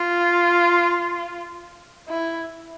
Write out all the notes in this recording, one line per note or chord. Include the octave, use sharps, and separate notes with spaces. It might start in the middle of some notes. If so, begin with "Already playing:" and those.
Already playing: F4
E4